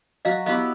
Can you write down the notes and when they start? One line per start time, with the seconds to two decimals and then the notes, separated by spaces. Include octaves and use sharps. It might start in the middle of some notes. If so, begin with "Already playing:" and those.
0.25 F#3 D#5 F5
0.46 B3 E4 G4 D#5 F5